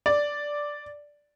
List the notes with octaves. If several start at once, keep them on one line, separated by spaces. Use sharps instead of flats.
D5